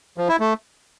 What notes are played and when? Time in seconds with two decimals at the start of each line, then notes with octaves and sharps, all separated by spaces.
0.18 F3
0.29 E4
0.40 A3